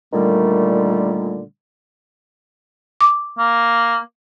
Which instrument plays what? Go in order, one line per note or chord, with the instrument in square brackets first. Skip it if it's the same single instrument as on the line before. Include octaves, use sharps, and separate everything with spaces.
[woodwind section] A#2 D3 D#3 G3 A3
[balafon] D6
[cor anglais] A#3